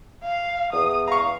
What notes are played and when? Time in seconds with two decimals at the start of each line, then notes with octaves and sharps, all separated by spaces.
0.23 F5
0.73 E2 D#6
1.08 F5 A#5 C#6